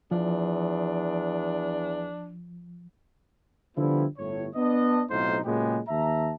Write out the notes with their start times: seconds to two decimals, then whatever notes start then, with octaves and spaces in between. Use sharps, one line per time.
0.11 E2 F3 D4
3.77 D3 F3 G3 B3 E4
4.18 G1 A2 C#5
4.55 B3 D4 D#5
5.10 B1 A2 C4 D#4 F4 C5
5.45 A#2 C#3 F#3 G#3 B3 G4
5.88 D#2 E5 A5 A#5